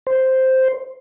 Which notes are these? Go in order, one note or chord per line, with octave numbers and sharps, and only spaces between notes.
C5